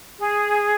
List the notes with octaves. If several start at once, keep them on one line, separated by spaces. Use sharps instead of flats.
G#4